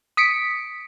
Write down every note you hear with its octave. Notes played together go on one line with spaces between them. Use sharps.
D#6 B6 C#7 D7